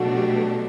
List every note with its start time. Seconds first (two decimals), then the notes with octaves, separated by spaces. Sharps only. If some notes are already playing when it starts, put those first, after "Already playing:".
Already playing: B2 F#3 A3 D4 F#4
0.17 G4